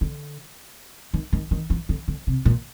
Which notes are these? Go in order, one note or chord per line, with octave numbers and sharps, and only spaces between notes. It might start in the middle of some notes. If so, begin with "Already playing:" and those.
D3
D#3
D#3
D#3
E3
D3
D3
C3
A#2